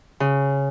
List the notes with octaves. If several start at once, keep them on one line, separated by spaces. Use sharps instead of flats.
C#3